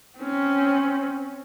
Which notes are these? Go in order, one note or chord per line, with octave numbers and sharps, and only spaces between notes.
C4 C#4